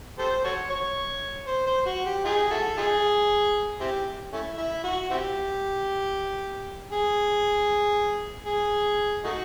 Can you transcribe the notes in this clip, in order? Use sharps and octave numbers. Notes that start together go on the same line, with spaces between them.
G4 A4 C5
F#4 A4 C#5
C#5
C5
C5
F#4
G4
D#4 F4 G#4
E4 F#4 A4
D#4 F4 G#4
C4 E4 G4
A3 C#4 E4
E4
F#4
C4 E4 G4
G#4
G#4
A3 D#4 F#4